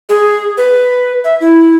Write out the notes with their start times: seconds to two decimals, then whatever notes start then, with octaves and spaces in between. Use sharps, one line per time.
0.09 G#4
0.58 B4
1.24 E5
1.40 E4